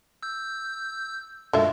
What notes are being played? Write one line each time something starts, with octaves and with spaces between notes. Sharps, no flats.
E6 G6
F#2 B2 D3 G#3 F4 E5